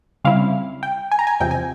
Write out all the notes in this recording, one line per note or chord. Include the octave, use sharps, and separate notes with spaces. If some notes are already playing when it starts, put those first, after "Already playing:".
C#3 G3 C4 E4 F5
G5
G#5
A#5
G#5
E2 C3 F3 C4 G5
G#5